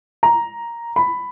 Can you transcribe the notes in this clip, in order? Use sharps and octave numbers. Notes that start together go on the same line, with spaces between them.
A#5
B5